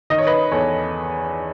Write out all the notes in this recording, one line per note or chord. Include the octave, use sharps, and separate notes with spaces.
D#3 D#5
C#5
B4 D#5
E2 A4 C#5